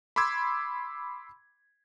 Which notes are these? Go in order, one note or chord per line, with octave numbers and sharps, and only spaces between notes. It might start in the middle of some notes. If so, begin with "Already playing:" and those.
B5 C6 D6 E6 G#6